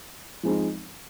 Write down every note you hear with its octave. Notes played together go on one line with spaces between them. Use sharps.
F3 G#3 C4 D#4